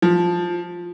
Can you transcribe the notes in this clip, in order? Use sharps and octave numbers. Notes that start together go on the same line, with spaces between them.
F3